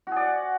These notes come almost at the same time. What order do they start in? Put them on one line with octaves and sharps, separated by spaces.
F#4 G#4 D5 F#5